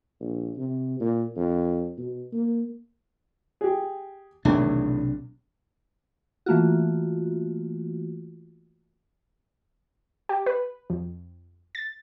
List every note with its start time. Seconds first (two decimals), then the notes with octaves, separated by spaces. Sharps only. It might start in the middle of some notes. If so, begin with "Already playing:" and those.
0.20 A#1
0.58 C3
1.00 A#2
1.36 F2
1.98 B2
2.32 A#3
3.61 G4 G#4
4.45 B1 E2 A2 C3 D#3 D4
6.46 E3 A3 A#3 F4 F#4
10.29 G4
10.46 B4
10.90 F2
11.75 A6